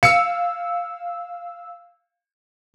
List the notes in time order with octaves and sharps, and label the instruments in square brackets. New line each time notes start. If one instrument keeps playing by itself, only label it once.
[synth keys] F5 E6 [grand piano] C#7